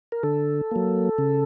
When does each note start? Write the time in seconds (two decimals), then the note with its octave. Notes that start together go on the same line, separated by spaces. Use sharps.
0.12 A#4
0.23 D3 A4
0.71 F#3 A#3
1.18 C#3